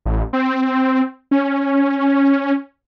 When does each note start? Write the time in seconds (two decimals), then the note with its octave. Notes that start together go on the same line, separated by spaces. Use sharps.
0.05 A1
0.33 C4
1.31 C#4